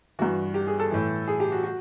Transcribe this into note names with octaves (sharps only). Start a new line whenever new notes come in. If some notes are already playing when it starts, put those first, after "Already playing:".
G2 E3 F#4
G4
G#4
A4
A2 E3
G#4
G4
F#4
F#4